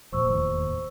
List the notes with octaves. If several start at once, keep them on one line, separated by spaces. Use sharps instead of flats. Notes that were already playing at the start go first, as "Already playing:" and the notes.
D#1 A#2 F3 C5 C#6 E6
E1 D#2 A2